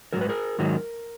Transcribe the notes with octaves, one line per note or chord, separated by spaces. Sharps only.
G#2 D#3 F#3 A#4
B4
G#4 A#4
G#2 D#3 F#3